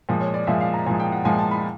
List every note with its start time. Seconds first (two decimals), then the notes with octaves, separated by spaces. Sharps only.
0.09 A#2 F3 G#3
0.21 C#5
0.34 D5
0.47 A#2 F3 G#3 E5
0.61 F5
0.74 A#5
0.86 A#2 F3 G#3 G#5
1.00 G5
1.12 F#5
1.25 A#2 F3 G#3 G#5
1.39 A5
1.51 B5